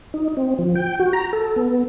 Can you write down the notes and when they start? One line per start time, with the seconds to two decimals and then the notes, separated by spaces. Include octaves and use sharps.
0.14 D#4
0.37 C4
0.59 F3
0.75 G5
1.00 F#4
1.13 A#5
1.33 A4
1.56 B3